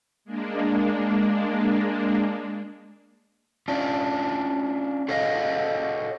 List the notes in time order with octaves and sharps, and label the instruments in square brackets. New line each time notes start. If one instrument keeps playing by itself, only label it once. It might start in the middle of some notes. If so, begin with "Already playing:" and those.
[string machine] G#3 A#3 D4
[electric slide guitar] C#4 D4 F4
F#4 G#4 A4 C#5 D#5 F5